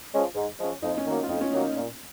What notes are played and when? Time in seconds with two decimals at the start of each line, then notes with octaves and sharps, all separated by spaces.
0.12 F3 G#3 C#4
0.35 G#2
0.59 F3 G#3 C#4
0.82 F2 D#4
0.98 C#4
1.05 D#3 F#3 A#3
1.14 D#4
1.23 F4
1.29 F2 D#4
1.41 C#4
1.52 D#3 F#3 A#3 D#4
1.64 D#4
1.76 A#2